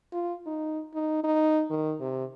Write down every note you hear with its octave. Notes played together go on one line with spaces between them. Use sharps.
F4
D#4
D#4
D#4
D#3
C3